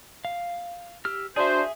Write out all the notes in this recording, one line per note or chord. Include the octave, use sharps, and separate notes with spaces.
F5
G4 E6 F6
D4 F#4 G#4 C5 E5